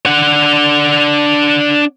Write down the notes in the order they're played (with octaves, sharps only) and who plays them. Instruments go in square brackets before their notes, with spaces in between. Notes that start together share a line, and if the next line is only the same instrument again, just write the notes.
[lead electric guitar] D4 F#5